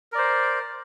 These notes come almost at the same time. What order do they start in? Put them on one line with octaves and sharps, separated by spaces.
A#4 D5 C5